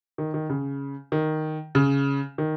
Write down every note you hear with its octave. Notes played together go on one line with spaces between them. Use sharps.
D#3
D#3
C#3
D#3
C#3
D#3